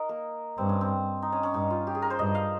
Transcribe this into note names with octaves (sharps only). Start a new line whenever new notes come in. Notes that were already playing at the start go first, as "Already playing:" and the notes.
Already playing: D#4 A#4 D#5
A#3
G2 C4
C#4
C4
D#4
C#4
C#4
G2 D#4
F4
G4
G#4
A#4
C5
G2 D#5
F5